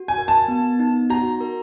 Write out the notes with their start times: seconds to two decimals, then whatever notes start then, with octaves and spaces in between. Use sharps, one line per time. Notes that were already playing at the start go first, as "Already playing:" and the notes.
Already playing: F#4
0.08 G#5
0.18 A#4
0.28 A5
0.48 B3
0.80 D#4
1.10 F#4 A#5
1.41 A#4